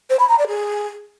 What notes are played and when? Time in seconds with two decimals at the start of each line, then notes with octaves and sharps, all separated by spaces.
0.10 C5
0.20 B5
0.29 A#5
0.39 D5
0.48 G#4